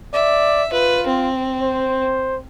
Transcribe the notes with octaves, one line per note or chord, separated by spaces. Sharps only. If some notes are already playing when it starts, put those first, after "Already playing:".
D5 E5
F4 B4
C4
C5